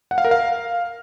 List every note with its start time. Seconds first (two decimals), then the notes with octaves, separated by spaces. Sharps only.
0.11 F#5
0.18 F5
0.25 A#4
0.31 F5